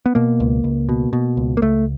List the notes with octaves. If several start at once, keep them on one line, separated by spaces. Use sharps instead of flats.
B3
B2 A#3
C#2
C#2
B2
B2
C#2
A#3
C#2 A3